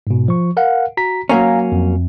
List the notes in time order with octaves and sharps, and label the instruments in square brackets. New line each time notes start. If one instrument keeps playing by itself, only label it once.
[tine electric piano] G#2 B2
F3 C#6
A#4 F5 F#5
F#4 A#5 B6
[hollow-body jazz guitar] F#3 A#3 C#4 [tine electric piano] F5 G#5 A#5
[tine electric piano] F2